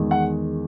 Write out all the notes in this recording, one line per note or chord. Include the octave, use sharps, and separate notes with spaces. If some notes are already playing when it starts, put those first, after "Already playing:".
Already playing: E2 D#3 G#3
F#5